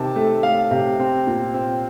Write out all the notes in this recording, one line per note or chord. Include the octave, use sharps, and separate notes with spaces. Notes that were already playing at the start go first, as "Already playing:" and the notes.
Already playing: C3 D#3 A5
A3
A3 F5
C3
C4
A#2
C4